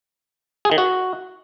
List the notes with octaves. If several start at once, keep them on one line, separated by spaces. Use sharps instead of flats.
G#4
D#3
F#4